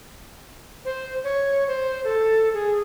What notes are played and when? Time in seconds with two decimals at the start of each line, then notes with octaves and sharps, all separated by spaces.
0.85 C5
1.24 C#5
1.67 C5
2.04 A4
2.54 G#4